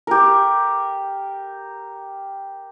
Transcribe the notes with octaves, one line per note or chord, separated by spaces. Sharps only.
G4 A#4